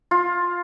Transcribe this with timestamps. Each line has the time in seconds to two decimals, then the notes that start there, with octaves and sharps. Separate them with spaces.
0.11 F4